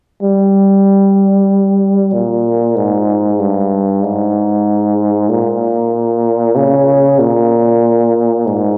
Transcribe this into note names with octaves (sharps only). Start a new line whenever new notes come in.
G3
A#2
G#2
G2
G#2
A#2
C#3
A#2
G#2